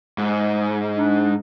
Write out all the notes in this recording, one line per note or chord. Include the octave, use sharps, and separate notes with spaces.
G#2
D4